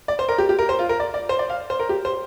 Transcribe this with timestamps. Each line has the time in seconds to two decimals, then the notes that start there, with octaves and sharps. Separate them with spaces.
0.08 D5
0.19 C5
0.29 A#4
0.38 G4
0.49 G4
0.59 A#4
0.69 C5
0.79 F4
0.89 A#4
1.00 D5
1.14 D5
1.29 C5
1.39 D5
1.50 F5
1.70 C5
1.79 A#4
1.89 G4
2.05 C5